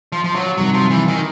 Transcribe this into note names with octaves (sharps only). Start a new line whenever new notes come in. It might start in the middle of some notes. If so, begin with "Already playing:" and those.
F3
F3
F#3
C3 D#3 F#3 G3
F3
E3
D#3